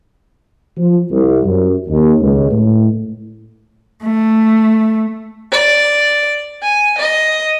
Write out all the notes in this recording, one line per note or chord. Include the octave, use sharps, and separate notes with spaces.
F3
C2
F#2
D#2
C#2
A2
A3
D5
G#5
D#5